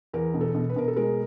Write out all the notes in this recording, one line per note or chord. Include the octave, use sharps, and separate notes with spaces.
E2 A#4
B2
A4
B2
B4
B2 A#4
A4
G#3 A#4